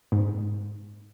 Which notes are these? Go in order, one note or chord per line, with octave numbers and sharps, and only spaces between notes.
G#2